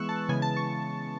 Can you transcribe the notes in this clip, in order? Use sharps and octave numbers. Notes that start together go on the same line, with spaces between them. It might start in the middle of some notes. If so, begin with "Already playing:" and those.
Already playing: E3 G#3 B3 C#6 E6 F#6
A5
C#3 E3 G#3 B3 G#5
A5
C#6